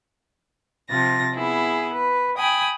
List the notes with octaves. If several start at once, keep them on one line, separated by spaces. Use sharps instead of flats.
C3 F3 A6 A#6
B3 E4 G#4
B4
G5 G#5 B5 D#6